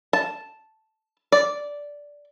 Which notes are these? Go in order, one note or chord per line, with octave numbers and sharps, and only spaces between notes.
A5
D5